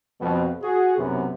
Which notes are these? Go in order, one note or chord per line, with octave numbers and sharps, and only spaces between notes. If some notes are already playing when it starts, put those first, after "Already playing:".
F2 B2
F#4 G#4
B1 F#2 C3 B3